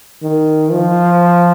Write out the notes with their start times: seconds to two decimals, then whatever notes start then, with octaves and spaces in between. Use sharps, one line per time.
0.23 D#3
0.71 F3